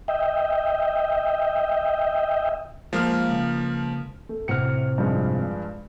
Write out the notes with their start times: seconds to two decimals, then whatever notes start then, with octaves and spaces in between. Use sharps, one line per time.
0.08 D#5 E5 G5
2.93 F3 G#3 A#3 C5 F6
3.30 C#2
4.29 A3
4.48 A2 C3 F#4 F6 C#7
4.98 G2 F3 G#3